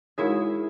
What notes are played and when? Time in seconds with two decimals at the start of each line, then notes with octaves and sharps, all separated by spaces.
0.18 G#3 D#4 E4 F#4 G#4 A#4 C#5